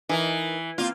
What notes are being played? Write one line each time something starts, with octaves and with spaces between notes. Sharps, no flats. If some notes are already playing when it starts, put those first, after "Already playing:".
E3 D#4 A#4 E5
A#3 C4 F4